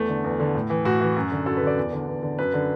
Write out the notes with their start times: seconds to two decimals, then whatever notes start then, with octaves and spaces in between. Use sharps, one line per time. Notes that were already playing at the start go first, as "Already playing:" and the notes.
Already playing: E2 A3
0.09 D3
0.24 E2
0.40 D3
0.55 A2
0.70 E3
0.85 A2 F#4
1.01 E3
1.16 F#2
1.32 D3
1.46 F#2 A4
1.56 B4
1.62 D3
1.67 D5
1.78 E2
1.93 D3
2.07 E2
2.23 D3
2.39 F#2 B4
2.54 D3